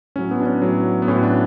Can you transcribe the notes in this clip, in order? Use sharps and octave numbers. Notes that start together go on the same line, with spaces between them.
A2 F#3 C#4
B3
D4
C#4
A2 F#3
B3
A2 F#3 C#4
D4